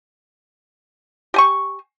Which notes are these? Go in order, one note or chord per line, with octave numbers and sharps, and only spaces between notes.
G4 G#5 C#6